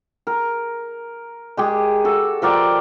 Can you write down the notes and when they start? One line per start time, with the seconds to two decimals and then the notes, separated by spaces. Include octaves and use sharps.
0.27 A#4
1.57 G#3 G4 G#4
2.05 F#4 A4
2.42 F3 A#4 D5 G5